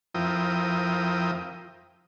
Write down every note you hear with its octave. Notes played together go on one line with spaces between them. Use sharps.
F2 F3 E4 A#4 G5 D#6